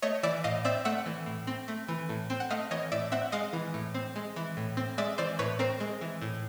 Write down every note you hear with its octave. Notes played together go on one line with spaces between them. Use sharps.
A3 C#5 D#5
E3 D5 E5
A2 D#5 F5
C4 D5 E5
A3 E5 F#5
E3
A2
C4
A3
E3
A2
C4
F#5
A3 D#5 F5
E3 C#5 D#5
A2 D5 E5
C4 E5 F#5
G#3 D#5 F5
E3
A2
C4
G#3
E3
A2
C4
G#3 D5 E5
E3 C5 D5
A2 B4 C#5
C4 A#4 C5
G#3
E3
A2